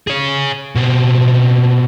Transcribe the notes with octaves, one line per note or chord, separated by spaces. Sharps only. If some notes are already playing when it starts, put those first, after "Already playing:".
G#4 C#5
B2 C4